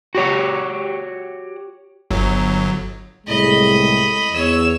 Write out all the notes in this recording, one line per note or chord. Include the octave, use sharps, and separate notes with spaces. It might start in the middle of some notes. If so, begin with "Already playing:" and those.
F#4 G4 C#5
G1 F#3
C2 A2 G#3 D#5 B5
E2 C#5 E6